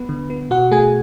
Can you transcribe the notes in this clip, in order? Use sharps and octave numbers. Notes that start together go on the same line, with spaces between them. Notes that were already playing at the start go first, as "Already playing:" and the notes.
Already playing: B3 B4
D3
B3
B2 F#4 F#5
A3 G#4 G#5